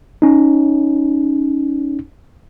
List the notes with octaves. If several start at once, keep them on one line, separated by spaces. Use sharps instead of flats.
C#4 D#4